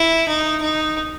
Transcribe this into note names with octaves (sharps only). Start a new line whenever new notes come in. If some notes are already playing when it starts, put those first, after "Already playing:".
Already playing: E4
D#4
D#4